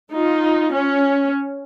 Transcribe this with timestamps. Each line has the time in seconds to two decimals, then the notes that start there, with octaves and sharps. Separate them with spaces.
0.12 D#4 F4
0.73 C#4